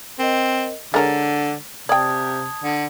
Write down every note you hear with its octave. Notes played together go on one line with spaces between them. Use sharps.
C4 A#4 D#5
D3 G#3 A#4 C#5 A6
C3 D5 G5 A5 D#6 G#6
D3